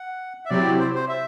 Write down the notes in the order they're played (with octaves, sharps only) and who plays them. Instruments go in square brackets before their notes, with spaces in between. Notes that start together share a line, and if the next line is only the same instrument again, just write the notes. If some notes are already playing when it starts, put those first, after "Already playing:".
Already playing: [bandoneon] F#5
E5
[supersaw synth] C3 F#3 C4 E4 G4 [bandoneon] D5
[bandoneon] C5
C5
E5